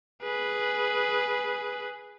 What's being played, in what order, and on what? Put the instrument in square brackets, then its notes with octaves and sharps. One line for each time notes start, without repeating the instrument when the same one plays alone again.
[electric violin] G#4 B4